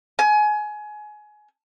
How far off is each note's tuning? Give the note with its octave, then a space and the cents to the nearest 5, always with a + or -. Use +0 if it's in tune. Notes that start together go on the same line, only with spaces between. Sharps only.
G#5 +25